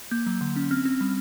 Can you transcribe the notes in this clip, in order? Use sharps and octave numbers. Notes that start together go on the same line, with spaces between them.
A#3 G6
F#3
D3
C#4
C4 F6
C4
G3